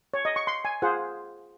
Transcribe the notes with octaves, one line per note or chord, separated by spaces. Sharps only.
C#5
D#5
C#6
C6
G#5
F4 G#4 C5 F#5